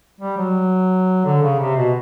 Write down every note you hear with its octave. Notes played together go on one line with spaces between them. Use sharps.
G3
F#3
D3
C#3
C3
B2